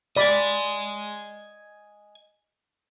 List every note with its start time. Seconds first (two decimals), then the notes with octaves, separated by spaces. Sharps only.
0.17 D5 D#5 G#5 B5